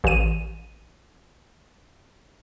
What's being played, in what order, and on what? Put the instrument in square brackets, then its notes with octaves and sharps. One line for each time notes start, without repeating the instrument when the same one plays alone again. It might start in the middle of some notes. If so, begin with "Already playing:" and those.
[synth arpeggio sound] A1 D#7